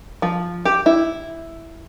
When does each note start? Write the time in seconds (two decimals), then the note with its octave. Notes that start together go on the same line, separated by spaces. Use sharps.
0.22 F3
0.65 G4
0.86 E4